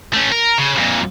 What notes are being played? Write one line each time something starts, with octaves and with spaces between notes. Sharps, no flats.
A3 C#4
A#4
C#3
F2 A#2